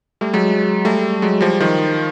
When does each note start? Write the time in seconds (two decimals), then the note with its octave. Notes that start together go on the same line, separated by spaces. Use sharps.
0.21 G3 A3
0.33 F#3 G#3
0.85 G3 A3
1.22 F#3 G#3
1.41 F3 G3
1.60 D#3 F3